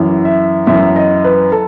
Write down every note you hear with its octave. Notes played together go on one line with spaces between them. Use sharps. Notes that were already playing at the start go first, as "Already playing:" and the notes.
Already playing: F#2 E3
E5
F#2 E3 E5
D#5
B4
A4